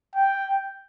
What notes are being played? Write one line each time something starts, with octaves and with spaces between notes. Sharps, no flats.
G5